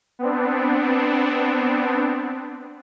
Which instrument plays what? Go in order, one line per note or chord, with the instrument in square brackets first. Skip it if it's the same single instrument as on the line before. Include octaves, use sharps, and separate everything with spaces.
[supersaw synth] B3 C4 D4